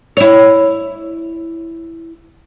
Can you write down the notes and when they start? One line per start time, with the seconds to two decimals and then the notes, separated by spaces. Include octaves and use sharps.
0.17 E4 C#5